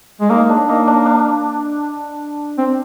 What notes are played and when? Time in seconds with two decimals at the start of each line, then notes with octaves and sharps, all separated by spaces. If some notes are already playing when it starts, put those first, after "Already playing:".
0.21 G#3
0.30 A#3 D#4
0.49 D4
0.68 A#3 D#4
0.87 D4
1.06 D4
2.58 C4